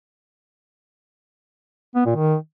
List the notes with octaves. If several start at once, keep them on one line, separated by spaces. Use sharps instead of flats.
B3
A#2
D#3